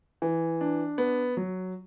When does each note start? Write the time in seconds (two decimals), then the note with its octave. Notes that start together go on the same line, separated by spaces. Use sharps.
0.22 E3
0.61 D4
0.98 B3
1.37 F#3